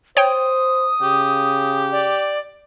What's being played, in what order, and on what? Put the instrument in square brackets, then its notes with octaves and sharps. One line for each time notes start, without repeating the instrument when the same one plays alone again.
[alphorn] C5 [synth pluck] C#5 G5 [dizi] D#6
[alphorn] C#3 [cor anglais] G4
[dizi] D5